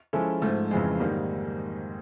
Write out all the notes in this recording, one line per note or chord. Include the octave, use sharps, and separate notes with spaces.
F3 G#3 C#4 E4 A4
G#2 F3 A3
F2 C#3 E3 G#3
G#2 D#3 G3 A#3